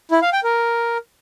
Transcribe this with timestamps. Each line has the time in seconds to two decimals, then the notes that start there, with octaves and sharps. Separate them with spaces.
0.11 E4
0.22 F5
0.33 G5
0.44 A#4